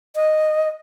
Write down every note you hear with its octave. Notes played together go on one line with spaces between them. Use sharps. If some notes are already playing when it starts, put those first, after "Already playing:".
D#5